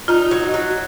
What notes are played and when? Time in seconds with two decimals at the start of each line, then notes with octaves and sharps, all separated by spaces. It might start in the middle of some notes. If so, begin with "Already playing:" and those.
0.08 D#4 F4
0.31 F#3
0.54 F#3